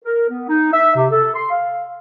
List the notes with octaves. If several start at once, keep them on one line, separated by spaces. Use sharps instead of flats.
A#4
B3
D#4
E5
C3
A4
C6
F5